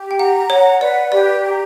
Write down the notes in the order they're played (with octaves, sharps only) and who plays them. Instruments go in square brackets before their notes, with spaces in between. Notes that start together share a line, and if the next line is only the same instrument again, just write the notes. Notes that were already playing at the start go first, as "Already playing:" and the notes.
Already playing: [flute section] G4
[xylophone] G5
[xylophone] F#5 [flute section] A#5
[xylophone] C#5 [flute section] F#5
[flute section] B4 [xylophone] D5
[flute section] G4 [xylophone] D5
[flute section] A#5